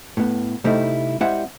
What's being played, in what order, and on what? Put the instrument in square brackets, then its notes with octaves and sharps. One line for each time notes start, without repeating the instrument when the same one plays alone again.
[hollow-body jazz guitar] A2 B3
C3 G3 A3 D#4 E4
G3 G#3 C4 E4 E5 F#5